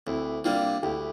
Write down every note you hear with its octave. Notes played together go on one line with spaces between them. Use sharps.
D2 C4 E4
C3 G3 A#3 D4 F4
D2 E4 G4